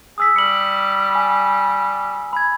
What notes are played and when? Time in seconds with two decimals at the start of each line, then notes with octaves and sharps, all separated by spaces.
0.18 G#4 D#6 E6 B6
0.36 G3 C#7 F#7
1.15 G#5
2.33 B5 G#6